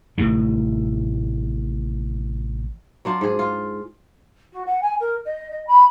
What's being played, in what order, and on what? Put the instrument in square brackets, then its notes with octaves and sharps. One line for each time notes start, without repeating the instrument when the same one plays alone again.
[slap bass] A1 A2 C3 D#3
[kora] F#3 D4 F4
G#2 G#4
F4
[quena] F#4
F#5
G#5
A#4
D#5
D#5
B5